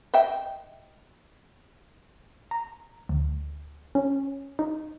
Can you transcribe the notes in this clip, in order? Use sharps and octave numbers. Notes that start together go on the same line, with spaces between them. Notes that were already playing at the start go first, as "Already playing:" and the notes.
D#5 E5 G5
A#5
D2
C#4
D#4